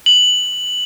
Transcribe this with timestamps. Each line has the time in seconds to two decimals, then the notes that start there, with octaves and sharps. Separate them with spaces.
0.06 F#7